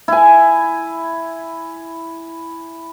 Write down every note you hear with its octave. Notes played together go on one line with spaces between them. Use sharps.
E4 G#5